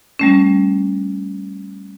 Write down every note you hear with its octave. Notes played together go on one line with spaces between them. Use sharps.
G3 A3 C#4